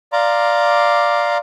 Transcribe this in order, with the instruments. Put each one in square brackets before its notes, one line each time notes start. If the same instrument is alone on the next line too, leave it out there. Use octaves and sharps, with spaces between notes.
[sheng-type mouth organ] D5 F5 A#5 C6 D6